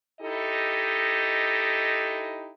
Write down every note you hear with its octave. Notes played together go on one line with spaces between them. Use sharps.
D#4 E4 G4 A4 D#5